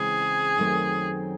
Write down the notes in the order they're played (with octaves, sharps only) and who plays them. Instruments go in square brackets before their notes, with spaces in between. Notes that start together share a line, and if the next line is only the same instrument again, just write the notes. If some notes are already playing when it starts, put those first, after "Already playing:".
Already playing: [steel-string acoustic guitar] C#3 E3 G#3 C4 E4 [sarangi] G#4
[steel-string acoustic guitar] F#2 D#3 F#3 A3 C4